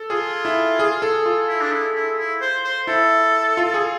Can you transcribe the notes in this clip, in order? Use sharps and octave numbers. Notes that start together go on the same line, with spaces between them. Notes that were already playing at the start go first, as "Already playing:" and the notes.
Already playing: A4
F4 G#4
E4
G#4
A4
F4
E4
D4
E4
E4
E4
C5
C5
E4 A4
F4
G#4